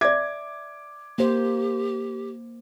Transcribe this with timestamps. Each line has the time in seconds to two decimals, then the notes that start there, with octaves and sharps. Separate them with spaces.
0.01 D5 E5 D6 G#6
1.18 A#3 G4 C5